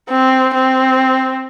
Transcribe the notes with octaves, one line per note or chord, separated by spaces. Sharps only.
C4
C4